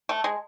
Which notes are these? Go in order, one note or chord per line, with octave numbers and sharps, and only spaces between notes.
A3
G#3